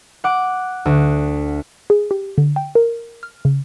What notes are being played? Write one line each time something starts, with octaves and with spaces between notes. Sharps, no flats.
F#5 D6
D2
G#4
G4
D3
G5
A#4
F6
C#3